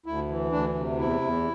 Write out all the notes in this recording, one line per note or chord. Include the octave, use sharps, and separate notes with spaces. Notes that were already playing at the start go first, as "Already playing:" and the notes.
D2 E4
E3
D2 D4
C3
E2 E4
E2